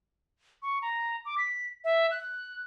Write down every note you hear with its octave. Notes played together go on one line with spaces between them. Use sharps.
C#6
A#5
D6
B6
E5
F#6